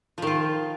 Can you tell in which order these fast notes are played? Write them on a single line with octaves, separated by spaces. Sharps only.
F3 D#3 F4